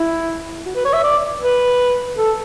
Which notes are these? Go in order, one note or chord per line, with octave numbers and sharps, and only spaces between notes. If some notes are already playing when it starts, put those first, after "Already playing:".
Already playing: E4
F#4
B4
C#5
E5
D5
B4
A4